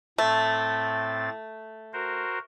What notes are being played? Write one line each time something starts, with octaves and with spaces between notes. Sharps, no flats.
A2 A3 C4 A6
F#4 A#4 C5